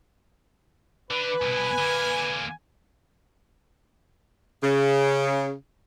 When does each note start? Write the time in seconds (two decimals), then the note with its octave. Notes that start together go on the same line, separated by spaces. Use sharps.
1.11 D3 B4
1.42 C2 B2 G#5
1.78 D3 A#3
4.63 C#3